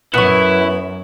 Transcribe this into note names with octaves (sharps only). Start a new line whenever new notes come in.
F#2 B3 E4 B4 C#5